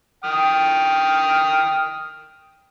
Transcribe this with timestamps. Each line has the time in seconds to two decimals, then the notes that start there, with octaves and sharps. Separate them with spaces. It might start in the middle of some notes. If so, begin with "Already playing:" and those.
0.24 G5 D#6 F6